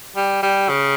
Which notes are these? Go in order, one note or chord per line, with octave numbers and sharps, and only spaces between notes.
G3
G3
C#3